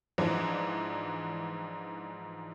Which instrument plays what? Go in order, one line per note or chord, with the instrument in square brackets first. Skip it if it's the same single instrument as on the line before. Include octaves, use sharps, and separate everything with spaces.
[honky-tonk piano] G#2 E3 F3 D4